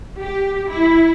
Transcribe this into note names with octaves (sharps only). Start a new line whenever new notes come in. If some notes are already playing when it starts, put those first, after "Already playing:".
G4
E4